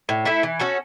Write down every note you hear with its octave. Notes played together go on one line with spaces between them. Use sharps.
A2
A3 E4 A4
E3
C#4 F#4 A4